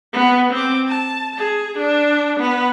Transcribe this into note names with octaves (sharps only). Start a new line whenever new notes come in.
B3
C4 D6
A5
G#4
D4
B3 B4